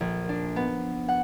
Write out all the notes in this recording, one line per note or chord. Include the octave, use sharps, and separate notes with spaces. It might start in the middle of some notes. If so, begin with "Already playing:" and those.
A#1
D4
B3
F#5